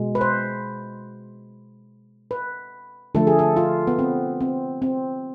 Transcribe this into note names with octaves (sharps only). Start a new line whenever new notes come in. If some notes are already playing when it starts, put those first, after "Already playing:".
Already playing: B2 G#3
B4
C5
B4
D3 F3 A3 A4
G#4
A4
F4
B3
C4
C4
C4